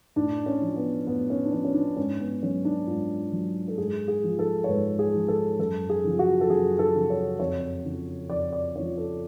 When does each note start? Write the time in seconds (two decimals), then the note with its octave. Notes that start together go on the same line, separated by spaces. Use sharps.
0.16 A2 D4
0.46 C#4
0.61 F3
0.76 B3
1.07 A2 B3
1.30 C#4
1.46 D4
1.52 F3 C#4
1.65 C#4
1.74 D4
1.97 G#2 C#4
2.20 B3
2.43 F#3 C#4
2.65 D4
2.87 G#2 F4
3.32 F#3
3.68 A4
3.78 G#2 G#4
4.08 G#4
4.24 F3
4.39 A4
4.64 C#5
4.68 G#2 B4
4.99 G#4
5.14 F3
5.28 A4
5.59 F#2 A4
5.90 G#4
6.04 C#3 F3
6.19 F#4
6.41 A4
6.50 F#2 G#4
6.79 A4
6.95 C#3 F3
7.10 C#5
7.40 F2 C#5
7.85 C#3 F3
8.30 F2 D5
8.53 D5
8.76 C#3 F3 C#5
8.97 A4